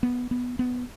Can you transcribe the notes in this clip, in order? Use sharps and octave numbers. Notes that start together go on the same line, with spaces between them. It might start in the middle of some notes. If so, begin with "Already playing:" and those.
B3
B3
B3